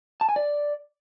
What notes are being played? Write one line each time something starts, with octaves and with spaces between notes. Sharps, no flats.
A5
G#5
D5